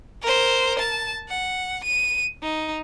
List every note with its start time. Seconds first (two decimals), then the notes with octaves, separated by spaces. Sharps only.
0.22 A#4 C5
0.79 A5
1.28 F#5
1.84 D#7
2.42 D#4